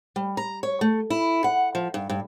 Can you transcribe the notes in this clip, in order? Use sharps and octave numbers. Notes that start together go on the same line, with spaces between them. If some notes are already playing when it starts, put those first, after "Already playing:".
G3
A#5
C#5
A3
E4
F#5
F3
G2
G2